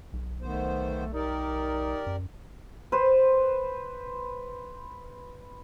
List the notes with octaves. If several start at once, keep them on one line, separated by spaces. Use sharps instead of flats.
B1
D#3 A3 B3 C5
D#4 G4 A#4 D5
F#2
B4 C5